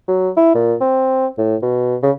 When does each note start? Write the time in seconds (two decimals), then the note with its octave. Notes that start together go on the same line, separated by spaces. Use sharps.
0.08 F#3
0.37 E4
0.55 A#2
0.81 C4
1.38 A2
1.62 B2
2.03 C#3